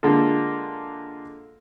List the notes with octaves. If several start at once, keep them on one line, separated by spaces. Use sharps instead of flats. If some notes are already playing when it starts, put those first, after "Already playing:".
D3 G#3 A#3 F4 A4